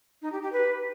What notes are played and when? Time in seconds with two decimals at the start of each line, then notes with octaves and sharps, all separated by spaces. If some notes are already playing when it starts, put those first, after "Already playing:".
0.22 D#4
0.32 G4
0.42 G4
0.52 B4